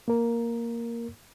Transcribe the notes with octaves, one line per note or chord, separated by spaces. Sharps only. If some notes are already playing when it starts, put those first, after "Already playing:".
A#3 A#4